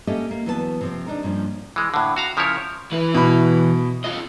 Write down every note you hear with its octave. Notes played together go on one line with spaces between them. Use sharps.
A#3 C#4 G4 A4 D#5 E5
A#3
E2 F#3 B3 B4 C#5 A5
C3 F3 C4
C3 D4 D#4 A#4
G2 A#2 F3 C#4
E3 G#3
A2 D3
F#4 F5 A#5
C#3 F3 E4 A#4 C#5
E3 B4
B2 B5
F4 D#5